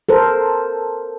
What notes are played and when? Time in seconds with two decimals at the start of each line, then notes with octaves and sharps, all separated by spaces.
0.09 A4 A#4 C5